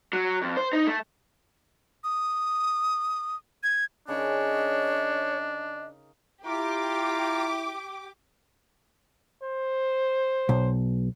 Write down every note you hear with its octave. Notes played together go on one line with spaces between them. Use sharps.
F#3
F2
C5
D#4
A3
D#6
G#6
C#3 D4 D#4 A#4 C#5 D#5
E4 F4 G4 A#5 D6
C5
B1